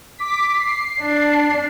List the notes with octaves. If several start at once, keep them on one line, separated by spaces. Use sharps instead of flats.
D6 B6
C7
D4